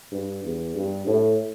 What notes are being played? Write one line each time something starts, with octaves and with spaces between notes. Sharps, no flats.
G2
E2
G2
A2